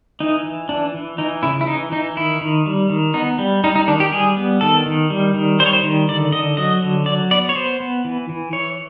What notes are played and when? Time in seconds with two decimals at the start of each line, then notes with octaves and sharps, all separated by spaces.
0.20 E3 D#4
0.45 E3
0.69 E3 D4
0.94 E3
1.18 E3 D#4
1.43 C#3 E4
1.61 E4
1.67 E3 D#4
1.92 E3 D#4
2.17 D#3 E4
2.41 D#3
2.66 G3
2.90 D#3
3.14 B3 D#4
3.38 G3
3.64 G3 D#4
3.76 D#4
3.88 D#3 D4
4.00 G4
4.12 G3 G#4
4.37 B3
4.61 D#3 A4
4.86 D#3
5.10 G3
5.34 D#3
5.60 G3 C5
5.66 C#5
5.73 C5
5.84 D#3
6.08 D3 D5
6.32 D3 D#5
6.57 F#3 D#5
6.82 D3
7.06 F#3 D5
7.31 B3 D5
7.49 C#5
7.55 B3 C5
7.80 B3
8.05 E3
8.29 E3
8.53 E3 C#5